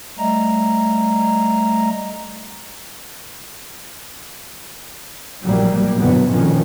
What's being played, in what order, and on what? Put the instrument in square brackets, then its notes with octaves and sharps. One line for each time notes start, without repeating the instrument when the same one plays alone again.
[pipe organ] G3 A3 D#5 A#5
[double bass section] A#1 A2 F#3 G3 A#3
G1 F2 B2 E3 F#3 B3
A#1 F2 B2 D#3 F3 C#4